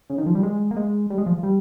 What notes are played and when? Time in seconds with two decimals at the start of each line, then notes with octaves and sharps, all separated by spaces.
0.10 C#3
0.18 D#3
0.26 F3
0.35 G3
0.43 G#3
0.71 A#3
0.76 G#3
1.10 G3
1.18 G#3
1.26 F3
1.43 G3